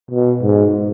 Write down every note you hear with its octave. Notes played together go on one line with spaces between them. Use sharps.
B2
G#2